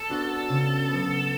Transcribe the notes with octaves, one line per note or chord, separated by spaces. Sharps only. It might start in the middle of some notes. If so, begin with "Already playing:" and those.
Already playing: A4
B3 D4 F#4
C#3
F#3 B3